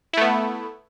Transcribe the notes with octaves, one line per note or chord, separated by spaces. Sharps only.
A3 B3 E4